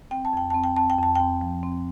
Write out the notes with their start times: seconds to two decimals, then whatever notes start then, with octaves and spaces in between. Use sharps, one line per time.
0.11 C4 G5
0.25 A5
0.33 F2 G5
0.50 C4 A5
0.64 G5
0.76 C4 A5
0.90 G5
0.98 F2 A5
1.15 C4 G5
1.41 F3
1.63 C4